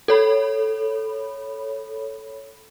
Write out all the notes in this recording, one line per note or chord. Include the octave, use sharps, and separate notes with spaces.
A4 C#5 B5